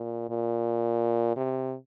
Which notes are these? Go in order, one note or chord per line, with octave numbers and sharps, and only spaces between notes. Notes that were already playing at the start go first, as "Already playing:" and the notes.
Already playing: A#2
A#2
C3